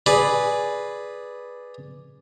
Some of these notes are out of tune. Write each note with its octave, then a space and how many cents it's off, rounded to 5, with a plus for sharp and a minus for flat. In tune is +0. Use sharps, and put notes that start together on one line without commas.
G#4 +0 B4 -5 D5 +0